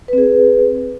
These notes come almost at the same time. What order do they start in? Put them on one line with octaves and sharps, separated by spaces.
B4 C4 G#4